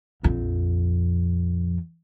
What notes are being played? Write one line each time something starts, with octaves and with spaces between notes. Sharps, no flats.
A#1 F2